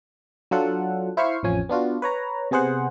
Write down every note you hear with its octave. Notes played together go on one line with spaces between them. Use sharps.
F#3 D4 F4 A4 F#5
E4 C5 E5 F5 C#6 C7
A1 F2 F3 C#4 G#5
B3 D4 F4 F#4
B4 C#5 A#5
C3 B3 G#4 C5 F#5